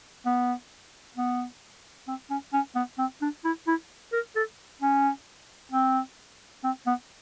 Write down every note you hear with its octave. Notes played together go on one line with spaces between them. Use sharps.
B3
B3
C4
C#4
C#4
B3
C4
D4
E4
E4
A#4
A4
C#4
C4
C4
B3